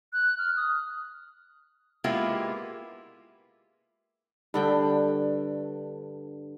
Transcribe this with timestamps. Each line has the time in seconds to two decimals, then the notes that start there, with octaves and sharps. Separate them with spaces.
0.13 F#6
0.38 F6
0.57 D#6
2.04 G#3 A#3 B3 E4 F4 G4
4.54 G2 D3 G5